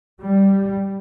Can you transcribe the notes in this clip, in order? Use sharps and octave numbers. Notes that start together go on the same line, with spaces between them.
G3